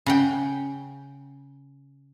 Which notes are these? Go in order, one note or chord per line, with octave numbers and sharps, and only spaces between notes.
C#3 F#5 G5